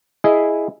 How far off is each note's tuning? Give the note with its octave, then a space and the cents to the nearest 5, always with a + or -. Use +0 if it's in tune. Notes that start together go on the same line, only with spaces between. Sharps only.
E4 +0 G#4 +0 D#5 +0